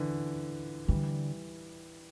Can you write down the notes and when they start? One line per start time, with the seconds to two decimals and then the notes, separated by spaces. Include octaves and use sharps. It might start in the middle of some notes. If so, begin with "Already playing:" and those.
Already playing: D3 E3
0.88 D3 E3 G3